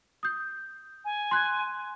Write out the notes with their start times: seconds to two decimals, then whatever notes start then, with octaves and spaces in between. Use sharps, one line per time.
0.23 D#6 G6
1.05 G#5
1.31 C6 F#6 G#6